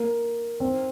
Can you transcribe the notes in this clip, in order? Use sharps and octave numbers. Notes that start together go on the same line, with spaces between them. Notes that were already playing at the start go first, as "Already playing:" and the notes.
Already playing: A#3
C4